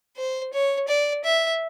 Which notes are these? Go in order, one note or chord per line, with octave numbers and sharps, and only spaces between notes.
C5
C#5
D5
E5